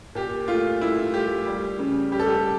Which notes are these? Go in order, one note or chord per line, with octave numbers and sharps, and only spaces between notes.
A#2 G4
A3 F4
A3 E4
A3 G4
G3
C#3
G3 G4
A4
G4